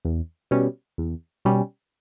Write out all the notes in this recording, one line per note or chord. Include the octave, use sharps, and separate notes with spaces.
E2
B2 G3 C#4
E2
B2 G3 C#4